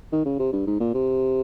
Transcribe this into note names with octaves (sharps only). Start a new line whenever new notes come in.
D#3
C#3
C3
G2
G#2
A#2
C3